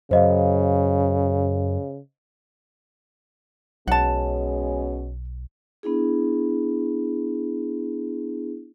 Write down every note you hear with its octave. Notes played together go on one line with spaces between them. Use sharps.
F#2 C#3 C5 D#5 F5
B1 B2 G#3 C#4 F#5 A5
B3 D4 E4 G#4